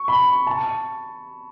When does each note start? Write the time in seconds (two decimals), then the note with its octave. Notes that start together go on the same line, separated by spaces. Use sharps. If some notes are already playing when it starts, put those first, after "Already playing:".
Already playing: C#6
0.08 B5
0.47 A5